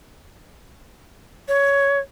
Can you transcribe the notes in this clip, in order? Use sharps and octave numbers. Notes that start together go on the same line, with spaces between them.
C#5